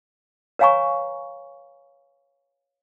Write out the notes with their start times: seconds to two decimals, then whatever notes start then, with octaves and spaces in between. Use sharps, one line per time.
0.59 B4 C#5 F5 G#5 A#5 C#6